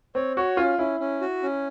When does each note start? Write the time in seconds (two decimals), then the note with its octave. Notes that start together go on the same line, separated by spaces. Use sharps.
0.15 C4 C#5
0.37 F#4 C#5
0.57 C#4 F4
0.79 C#4 E4
1.00 C#4
1.21 F#4
1.43 C#4